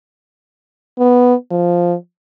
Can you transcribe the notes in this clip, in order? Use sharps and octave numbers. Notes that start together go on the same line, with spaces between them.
B3
F3